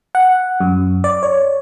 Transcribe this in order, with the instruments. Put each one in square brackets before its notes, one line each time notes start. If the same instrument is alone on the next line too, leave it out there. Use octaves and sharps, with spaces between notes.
[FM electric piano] F#5
F#2
D5
C#5